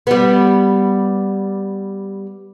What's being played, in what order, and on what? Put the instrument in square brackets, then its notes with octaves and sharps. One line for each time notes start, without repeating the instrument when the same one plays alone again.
[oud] G3 B3